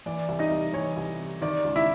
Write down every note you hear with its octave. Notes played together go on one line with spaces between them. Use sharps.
E3 D5
C2
D#4 D#5
C2
E3 C#5
C2
C3
D#3 D5
C#2
E4 E5